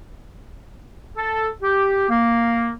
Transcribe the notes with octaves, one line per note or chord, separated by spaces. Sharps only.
A4
G4
A#3